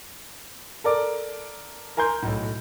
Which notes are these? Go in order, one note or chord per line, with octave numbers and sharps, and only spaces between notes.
A4 A#4 D5 D6
A#4 G#5 A#5 C6 G6
B1 A2